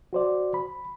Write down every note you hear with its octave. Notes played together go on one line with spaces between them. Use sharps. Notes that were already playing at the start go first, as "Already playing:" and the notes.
F#4 C5 D5
B5